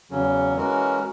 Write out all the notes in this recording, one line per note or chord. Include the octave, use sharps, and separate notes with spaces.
E2 C#3 F#3 C#4
E3 G#3 C#4 F#4 A#4